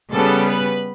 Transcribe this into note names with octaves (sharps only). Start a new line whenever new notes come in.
C#3 G3 B3 A4
B4